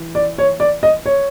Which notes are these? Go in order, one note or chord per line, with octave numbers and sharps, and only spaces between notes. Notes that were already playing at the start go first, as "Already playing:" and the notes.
Already playing: E3
D5
C#5
D5
D#5
C#5